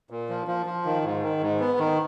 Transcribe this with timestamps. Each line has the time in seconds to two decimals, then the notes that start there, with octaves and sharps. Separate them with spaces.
0.10 A#2
0.29 F3
0.48 F3
0.66 F3
0.85 D#3
1.05 G#2
1.22 D#3
1.41 G#2
1.60 B3
1.79 D#3